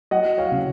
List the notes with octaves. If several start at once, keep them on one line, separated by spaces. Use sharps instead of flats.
F#3 D#5 F#5
C#5 F5
C#3